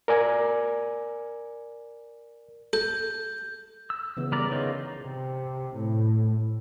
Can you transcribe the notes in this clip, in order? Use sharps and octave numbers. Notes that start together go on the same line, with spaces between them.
A#4 D5 G#5
A4 G6
E6
C#3 E3 B3
G3 A#4 D5
D#3 D#4 F4 G#4 C#5
C3
A2